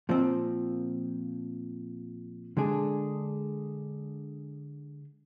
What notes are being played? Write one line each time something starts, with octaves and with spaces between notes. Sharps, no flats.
A#2 F3 C4
D3 G#3 D4 G#4